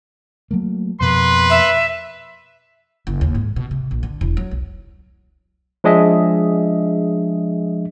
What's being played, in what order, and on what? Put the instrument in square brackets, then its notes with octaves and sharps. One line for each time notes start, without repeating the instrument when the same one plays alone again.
[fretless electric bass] F#3 A3 A#3
[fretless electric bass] F2 B2 [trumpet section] A#3 B4 C6
[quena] E5
[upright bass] F#1
D#2
G#2
B2
C3
A#1
D3
E1
F#3
B1
[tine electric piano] F3 G#3 D4 G#4 D#5 E5